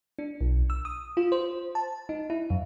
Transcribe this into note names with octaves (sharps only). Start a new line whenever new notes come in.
D4
B1
E6
D#6
F4
C5
A5
D#4
E4
F#2